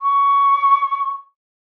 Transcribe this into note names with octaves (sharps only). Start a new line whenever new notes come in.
C#6